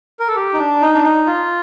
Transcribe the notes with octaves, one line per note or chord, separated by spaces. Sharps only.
A#4
A4
G4
D#4
D4
D#4
D4
D#4
F4